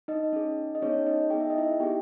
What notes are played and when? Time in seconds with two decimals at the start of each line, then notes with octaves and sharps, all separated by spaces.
0.08 D#4 D#5
0.33 C#4 G#4
0.75 D#5
0.82 B3 C#4 D#4 G#4 C#5
1.06 D#4 D#5
1.30 B3 D#4 G#4 G5
1.40 E5
1.50 D#5
1.58 E4 E5
1.80 B3 D#4 G4 G#4 G5